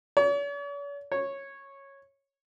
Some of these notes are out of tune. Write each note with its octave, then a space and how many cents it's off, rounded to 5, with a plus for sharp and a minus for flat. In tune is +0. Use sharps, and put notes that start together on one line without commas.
C#5 +45
C#5 -10